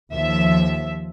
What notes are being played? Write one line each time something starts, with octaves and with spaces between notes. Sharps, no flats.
D#2 F3 E5